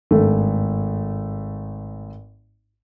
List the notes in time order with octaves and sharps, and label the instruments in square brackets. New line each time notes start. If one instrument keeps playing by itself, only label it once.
[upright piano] G#1 G2 A3